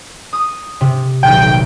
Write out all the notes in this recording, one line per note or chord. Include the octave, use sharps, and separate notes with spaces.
D#6
C3
D#1 B1 G5